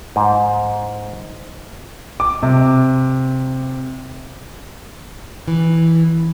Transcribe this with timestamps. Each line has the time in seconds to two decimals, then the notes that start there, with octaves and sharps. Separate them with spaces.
0.16 G#2
2.20 D6
2.43 C3
5.48 E3